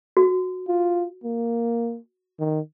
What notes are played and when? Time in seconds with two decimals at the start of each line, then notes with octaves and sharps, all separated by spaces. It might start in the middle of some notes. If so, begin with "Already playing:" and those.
0.17 F#4
0.68 F4
1.24 A#3
2.40 D#3